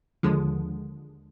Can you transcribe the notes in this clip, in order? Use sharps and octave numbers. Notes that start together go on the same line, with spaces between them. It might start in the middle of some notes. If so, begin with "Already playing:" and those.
D#2 D3 F3 G#3